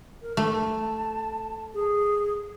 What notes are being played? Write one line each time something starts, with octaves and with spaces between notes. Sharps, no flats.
A#4
A3 A5
G#4